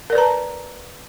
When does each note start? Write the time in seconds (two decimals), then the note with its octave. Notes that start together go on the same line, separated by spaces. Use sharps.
0.10 A#4
0.13 D5
0.15 B4
0.18 A#5
0.21 A5